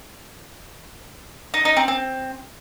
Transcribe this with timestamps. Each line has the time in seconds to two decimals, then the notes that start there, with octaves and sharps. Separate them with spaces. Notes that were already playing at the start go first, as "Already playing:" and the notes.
1.54 D#4
1.65 D#4
1.77 C4
1.88 C4